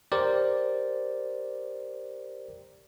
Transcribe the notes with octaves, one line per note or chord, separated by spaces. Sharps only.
G4 A#4 C5 D5